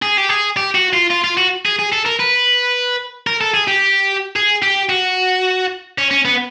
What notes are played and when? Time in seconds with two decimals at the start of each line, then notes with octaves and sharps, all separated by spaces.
0.02 G#4
0.18 G4
0.29 G#4
0.57 G4
0.75 F#4
0.93 F4
1.11 F4
1.24 F4
1.37 F#4
1.65 G#4
1.79 G#4
1.92 A4
2.05 A#4
2.19 B4
3.27 A#4
3.41 A4
3.54 G#4
3.68 G4
4.36 G#4
4.62 G4
4.89 F#4
5.98 C#4
6.11 C#4
6.25 B3